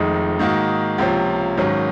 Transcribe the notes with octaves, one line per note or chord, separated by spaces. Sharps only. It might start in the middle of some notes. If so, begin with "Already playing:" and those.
Already playing: F1 F2 D#3 G#3 D#4
G#2 D#3 A#3 D#4 F#4
C#2 C3 F3 A#3 C#4
G#1 G#2 D#3 F#3 C#4